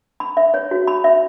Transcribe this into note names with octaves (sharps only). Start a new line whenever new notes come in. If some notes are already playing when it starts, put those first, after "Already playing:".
B5
E5
C#5
F#4
B5
E5